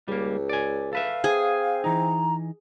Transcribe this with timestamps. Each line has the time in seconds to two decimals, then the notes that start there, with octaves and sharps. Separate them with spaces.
0.08 C#2 G3 A#3
0.49 D5 G#5
0.93 A4 B4 E5 F5
1.24 C4 G#4 G#5
1.84 E3 D#4 A#5